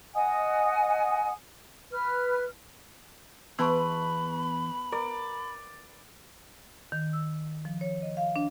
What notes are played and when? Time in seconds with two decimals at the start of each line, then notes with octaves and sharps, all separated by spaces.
0.14 D#5 F#5 G#5 D#6
1.92 B4 F6
3.59 E2 B3 B4 A5 B5 C#6
4.92 A#4 D5
6.92 D#3
7.13 E6
7.65 F3
7.81 C#5
8.02 D#5
8.17 F5
8.36 D4